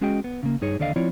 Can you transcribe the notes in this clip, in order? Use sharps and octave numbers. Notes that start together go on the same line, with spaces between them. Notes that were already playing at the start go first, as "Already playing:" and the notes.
G#3 C#4 F#4 G#4 D#5 G5
B3
C#3 A#3
G2 D#4 G#4 C#5
D#2 D3 A4 D5 D#5 F5
F3 C4 E4 F4 C#5 D5